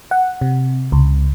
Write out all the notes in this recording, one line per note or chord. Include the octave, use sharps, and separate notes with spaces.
F#5
C3
C#2